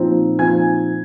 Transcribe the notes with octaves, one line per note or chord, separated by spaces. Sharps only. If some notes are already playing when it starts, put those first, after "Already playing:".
Already playing: A#2 F3 C4 D#4
A#2 F3 C4 D#4 G#5 G#6